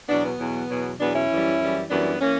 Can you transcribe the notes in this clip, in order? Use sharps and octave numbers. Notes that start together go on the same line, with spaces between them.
E2 B2 F#3 B3 D4
B3
E2 B2 F#3
E2 B2 F#3
E2 B2 F#3 B3 D4
C#4 E4
F#2 E3 G3
F#2 E3 G3
F#2 E3 G3 B3 D4
E3 A#3 C#4